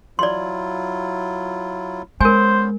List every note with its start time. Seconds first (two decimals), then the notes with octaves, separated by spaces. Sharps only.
0.19 F#3 E4 F4 D5 C6
2.21 G#3 B3 C#4 A#4 C5 G#5